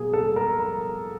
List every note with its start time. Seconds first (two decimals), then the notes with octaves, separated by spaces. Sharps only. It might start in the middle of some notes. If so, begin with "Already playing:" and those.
Already playing: B2 F#3 A#3 G#4
0.13 A4
0.36 A#4
0.59 A#4